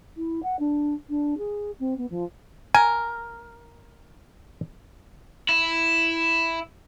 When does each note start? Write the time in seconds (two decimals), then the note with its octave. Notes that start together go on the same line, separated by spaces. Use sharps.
0.17 E4
0.43 F#5
0.59 D4
1.09 D4
1.38 G#4
1.80 C4
1.98 B3
2.10 F3
2.74 A#4 G#5
5.49 E4